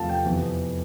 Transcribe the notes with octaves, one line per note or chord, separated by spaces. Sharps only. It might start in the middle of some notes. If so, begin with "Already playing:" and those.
Already playing: E2 C3 F3 A3 F5 A5
G5
F2 C3 E3 B3